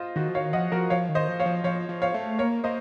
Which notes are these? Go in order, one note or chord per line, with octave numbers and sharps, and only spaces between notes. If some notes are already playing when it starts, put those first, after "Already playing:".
Already playing: F4 C5 D#5
D#3 F#4
F3
D#3 C#5 F5
F3 D#5 F#5
F3 F#4 A#4
F3 C#5 F5
D#3
C5 D#5
F3
C#5 F5
F3
F3 C#5 F5
F3
C#5 F5
A3
A#3 A#4 C#5
A#3 C5 D#5